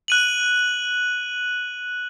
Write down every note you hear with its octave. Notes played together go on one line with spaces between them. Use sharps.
F#6 D#7 F#7